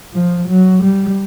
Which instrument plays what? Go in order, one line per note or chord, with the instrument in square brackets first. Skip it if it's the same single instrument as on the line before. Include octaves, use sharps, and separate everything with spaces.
[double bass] F3
F#3
G3